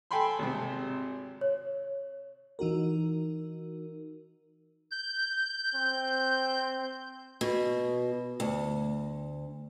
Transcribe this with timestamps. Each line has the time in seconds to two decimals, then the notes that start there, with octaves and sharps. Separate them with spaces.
0.11 A4 G5 G#5 B5 C6
0.39 G#1 C3
1.41 C#5
2.59 E3 D#4 F#4 A#4
4.91 G6
5.75 C4
7.41 B2
8.40 D2